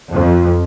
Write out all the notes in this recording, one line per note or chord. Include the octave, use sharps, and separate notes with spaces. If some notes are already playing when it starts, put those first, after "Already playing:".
F2